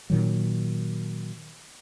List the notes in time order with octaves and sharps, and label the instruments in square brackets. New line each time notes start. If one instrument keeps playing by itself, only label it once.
[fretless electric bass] A#2 D#3 F#3